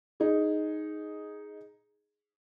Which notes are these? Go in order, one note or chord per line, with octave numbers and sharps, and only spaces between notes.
D#4 G#4